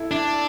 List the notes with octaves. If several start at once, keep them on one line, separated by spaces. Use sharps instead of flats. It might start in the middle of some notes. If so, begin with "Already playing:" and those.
Already playing: E4 A4
D4 E4